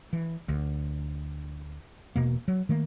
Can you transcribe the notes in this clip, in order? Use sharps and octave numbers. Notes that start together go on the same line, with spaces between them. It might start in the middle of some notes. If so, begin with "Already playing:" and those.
E3
D2
E1 F#2 B2 A#3
F#3
D#3 A3 A#3